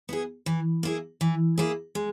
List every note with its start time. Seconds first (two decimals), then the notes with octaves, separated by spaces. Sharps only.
0.09 B3 E4 G#4
0.46 E3
0.83 A#3 E4 G#4
1.21 E3
1.58 A#3 E4 G#4
1.95 G#3